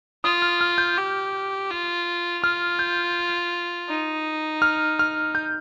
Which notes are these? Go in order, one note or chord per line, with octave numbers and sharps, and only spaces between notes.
F4 D#6
F6
F6
G6
G4
F4
F4 F6
G6
D#4
F6
F6
G6